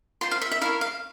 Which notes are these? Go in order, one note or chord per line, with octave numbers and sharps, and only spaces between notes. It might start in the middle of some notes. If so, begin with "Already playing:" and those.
F4 C5 C6
F5
E5
E5
E4 A#4 C#5 F5
F5